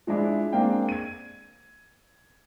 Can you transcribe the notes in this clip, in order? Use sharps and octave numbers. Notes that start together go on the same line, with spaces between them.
F3 G#3 D4 E4
G#3 A#3 C4 D4 F5 G5
G#6 D#7